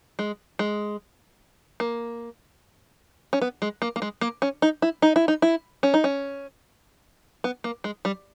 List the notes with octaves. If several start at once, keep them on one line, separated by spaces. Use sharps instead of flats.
G#3
G#3
A#3
C#4
B3
G#3
A#3
A#3
G#3
A#3
C#4
D#4
E4
D#4
E4
D#4
E4
C#4
D#4
C#4
B3
A#3
G#3
G3